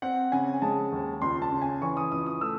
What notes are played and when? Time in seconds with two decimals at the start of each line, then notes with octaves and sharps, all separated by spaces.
0.02 C4 F#5
0.32 C#3 G#5
0.62 G#3 A5
0.92 D#2
1.22 C#2 C6
1.42 A5
1.52 C#3
1.62 G#5
1.82 E3 C#6
1.97 D#6
2.12 C#2 D#6
2.26 D#6
2.41 A3 E6